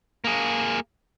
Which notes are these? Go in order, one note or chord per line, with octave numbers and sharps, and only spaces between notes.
A#3 G#4